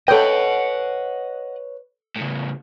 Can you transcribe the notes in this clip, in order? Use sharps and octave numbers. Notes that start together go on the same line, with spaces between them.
A4 B4 C#5 D#5 F#5 G5
A2 C#3